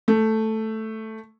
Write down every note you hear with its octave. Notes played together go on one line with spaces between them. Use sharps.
A3